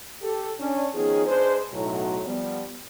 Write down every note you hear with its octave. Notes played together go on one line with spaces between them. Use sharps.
G4 A4
C#4 D4
D#3 F3 B3 C#4 D#4 G#4
G#3 D4 B4 C5
B1 A2 F#3
F3 G3 B3